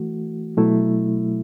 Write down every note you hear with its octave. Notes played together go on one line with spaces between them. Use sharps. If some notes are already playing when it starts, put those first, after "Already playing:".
Already playing: E3 A3 F#4
B2 F#3 A3 E4